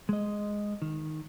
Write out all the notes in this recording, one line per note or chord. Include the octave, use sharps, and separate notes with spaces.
G#3 D#5
D#3